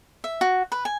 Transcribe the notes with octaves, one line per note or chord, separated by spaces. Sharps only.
E5
F#4
B4
G#5